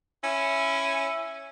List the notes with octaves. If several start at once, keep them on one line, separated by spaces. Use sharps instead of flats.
C#4 E4